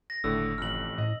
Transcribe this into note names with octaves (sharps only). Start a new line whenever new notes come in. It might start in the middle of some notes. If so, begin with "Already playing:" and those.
A#6
F#1 A2 D3 E6
A1 F2 F6 F#7
A2 D#5